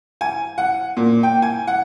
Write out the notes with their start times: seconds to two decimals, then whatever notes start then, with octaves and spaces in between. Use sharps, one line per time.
0.21 G#5
0.58 F#5
0.97 A#2
1.23 G5
1.42 G#5
1.67 F#5